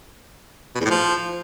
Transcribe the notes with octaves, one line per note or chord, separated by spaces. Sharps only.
B2
E2
A2
F3